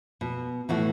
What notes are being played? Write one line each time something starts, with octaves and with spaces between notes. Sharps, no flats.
B2
A2 E3 F#4